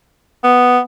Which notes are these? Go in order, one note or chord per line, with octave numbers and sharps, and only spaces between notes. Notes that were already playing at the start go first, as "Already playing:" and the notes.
B3